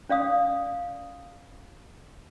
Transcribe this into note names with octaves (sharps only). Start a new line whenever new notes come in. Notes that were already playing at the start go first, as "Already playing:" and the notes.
C#4 D5 F5 D#6